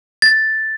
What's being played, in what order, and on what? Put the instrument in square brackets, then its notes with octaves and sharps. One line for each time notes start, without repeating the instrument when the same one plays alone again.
[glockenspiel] A6